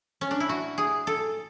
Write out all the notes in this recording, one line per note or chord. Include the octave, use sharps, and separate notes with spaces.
C#4
D4
E4
F#4
G#4
A4